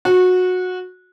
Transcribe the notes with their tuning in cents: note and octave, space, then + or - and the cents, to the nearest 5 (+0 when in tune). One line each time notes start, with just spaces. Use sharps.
F#4 -20